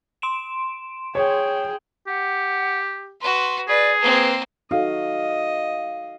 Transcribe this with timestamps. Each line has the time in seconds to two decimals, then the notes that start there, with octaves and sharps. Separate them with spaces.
0.22 C6 D7 E7
1.15 G#4 C#5 G5
2.07 G4 F#5
3.21 F#4 B4 C6
3.68 G#4 B4 D5
4.01 A#3 C4 B4
4.71 D#4 F#4 A4 D#5 F5